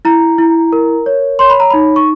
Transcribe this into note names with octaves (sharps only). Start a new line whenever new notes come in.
E4 A#5
E4
A#4
C#5
C#5 C6
B5
A#5
D#4 B5
C#6